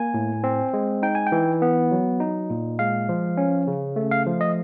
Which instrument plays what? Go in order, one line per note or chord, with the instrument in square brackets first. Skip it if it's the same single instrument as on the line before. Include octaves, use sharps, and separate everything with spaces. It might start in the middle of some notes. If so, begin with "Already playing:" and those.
Already playing: [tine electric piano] A#3 G#5
A2
C4
G#3
D#4 G5
G#5
G5
E3
B3
F#3
D#4
A#2
G#3 F5
F3
C#4
C#3
A3
F5
F3
D#5